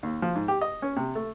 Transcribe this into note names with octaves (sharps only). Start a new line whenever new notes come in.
D#2
F3
G#2
G4
D#5
C#4
C3
A3